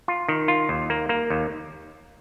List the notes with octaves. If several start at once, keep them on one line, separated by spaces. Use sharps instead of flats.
F4
D#3
F4
D#2
A#3
A#3
D#2